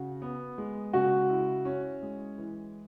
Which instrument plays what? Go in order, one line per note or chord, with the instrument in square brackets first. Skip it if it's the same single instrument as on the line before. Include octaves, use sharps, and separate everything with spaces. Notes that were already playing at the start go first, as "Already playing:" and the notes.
Already playing: [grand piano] C#3 F#4
B3
G#3
[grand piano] C#3 [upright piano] F#4
[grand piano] E4
C#4
G#3
E3